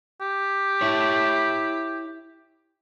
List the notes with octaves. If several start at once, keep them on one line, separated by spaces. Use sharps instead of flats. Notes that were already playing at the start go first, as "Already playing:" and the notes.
G4
E4 C#5